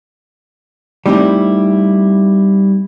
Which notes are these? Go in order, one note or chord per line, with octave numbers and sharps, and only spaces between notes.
G3 A3 C4 D#4 E4 G4